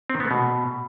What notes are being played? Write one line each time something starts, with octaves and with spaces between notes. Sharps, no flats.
C4
D#3
B3
A3
B2